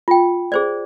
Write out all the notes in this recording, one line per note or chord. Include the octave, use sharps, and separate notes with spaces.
F4 G5
G#4 C5 D5